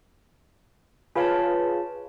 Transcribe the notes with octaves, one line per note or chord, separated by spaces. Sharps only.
F4 G#4 B4 C#5 F5 A5